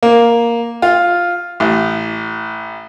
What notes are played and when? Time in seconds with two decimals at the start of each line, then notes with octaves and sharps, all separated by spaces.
0.03 A#3
0.82 F4
1.60 A1